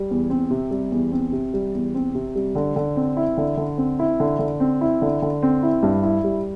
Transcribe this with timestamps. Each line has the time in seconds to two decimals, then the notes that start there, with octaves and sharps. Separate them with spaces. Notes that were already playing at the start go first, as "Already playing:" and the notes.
Already playing: G3
0.11 E2
0.30 C4
0.51 C3
0.71 G3
0.92 E2
1.12 C4
1.32 C3
1.54 G3
1.74 E2
1.94 C4
2.15 C3
2.35 G3
2.55 D3
2.76 D3
2.96 C4
3.17 E4
3.37 D3
3.57 D3
3.78 C4
3.99 E4
4.20 D3
4.39 D3
4.60 C4
4.81 E4
5.02 D3
5.22 D3
5.43 C4
5.63 E4
5.83 G2
6.03 E4
6.24 G3